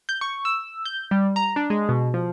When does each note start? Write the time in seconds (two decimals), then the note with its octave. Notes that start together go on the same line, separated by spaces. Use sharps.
0.09 G6
0.21 C#6
0.45 E6
0.85 G6
1.11 G3
1.36 A#5
1.56 D4
1.70 G#3
1.89 B2
2.14 F3